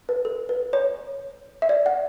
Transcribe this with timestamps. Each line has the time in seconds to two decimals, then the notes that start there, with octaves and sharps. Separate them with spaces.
0.09 B4
0.25 A4
0.49 B4
0.73 C#5
1.62 E5
1.69 D5
1.86 F#5